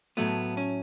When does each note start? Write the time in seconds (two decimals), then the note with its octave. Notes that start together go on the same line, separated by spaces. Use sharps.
0.17 A2 F#3 A3 B3
0.57 C#4